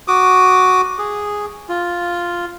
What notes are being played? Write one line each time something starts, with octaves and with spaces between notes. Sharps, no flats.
F#4 D6 D#6
G#4
F4